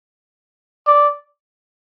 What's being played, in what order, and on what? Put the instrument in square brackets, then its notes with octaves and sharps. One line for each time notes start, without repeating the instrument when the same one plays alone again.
[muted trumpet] D5